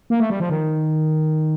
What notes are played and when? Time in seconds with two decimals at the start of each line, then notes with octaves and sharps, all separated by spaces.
0.10 A#3
0.20 A3
0.30 G3
0.40 F3
0.50 D#3